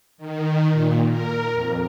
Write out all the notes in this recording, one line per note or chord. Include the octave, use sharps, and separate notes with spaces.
D#3
A#2
A#4
F2